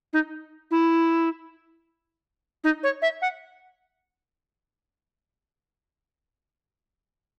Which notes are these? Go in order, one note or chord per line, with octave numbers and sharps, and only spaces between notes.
D#4
E4
D#4
C#5
E5
F#5